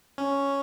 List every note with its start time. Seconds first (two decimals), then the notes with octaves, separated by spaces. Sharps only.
0.18 C#4